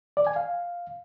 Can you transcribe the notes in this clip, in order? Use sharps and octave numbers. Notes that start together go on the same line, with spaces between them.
D5
G#5
F5